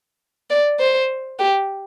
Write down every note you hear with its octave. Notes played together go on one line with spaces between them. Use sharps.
D5
C5
G4